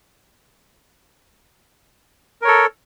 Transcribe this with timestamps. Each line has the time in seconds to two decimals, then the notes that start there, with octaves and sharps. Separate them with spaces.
2.42 A#4
2.45 C#5
2.48 A4